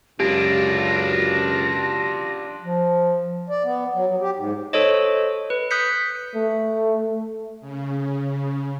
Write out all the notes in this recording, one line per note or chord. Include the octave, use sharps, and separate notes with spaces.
C#2 F#2 D4 F4 G4 A#6 D7
F3
D5
B3
F#3
F#3
G4
G#2
A4 C5 C#5 D#5
B4
D#6 F#6 G6 B6 C#7
A3
C#3